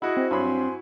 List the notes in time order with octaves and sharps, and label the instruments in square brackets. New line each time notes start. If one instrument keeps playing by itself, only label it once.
[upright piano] E4 F#4 [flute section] G#4 D#5 [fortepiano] F#5
[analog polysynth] C4
[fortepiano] G2 F#3 B5 [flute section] C5 G#5 C6